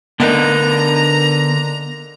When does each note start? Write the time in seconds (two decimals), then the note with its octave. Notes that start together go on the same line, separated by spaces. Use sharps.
0.20 D3 B3 D4 D#4 A#4 B4 A#5